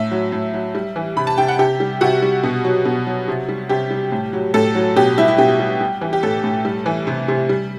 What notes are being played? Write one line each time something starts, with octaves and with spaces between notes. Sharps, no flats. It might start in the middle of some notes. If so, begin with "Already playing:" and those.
Already playing: A2 E5
F#3
A2
F#3
G3
E3
C3 B5
A5
C3 G5
F#5
C3 G4
G3
C3 F#4
G3
B2
F#3
B2
F#3
C3
G3
C3 G4
G3
A2
F#3
A2 A4
F#3
B2 G4
G3 E4
E4
B2 G4
G3
G3
E3
G4
A2 A4
A2
G3
E3
C3
C3
G3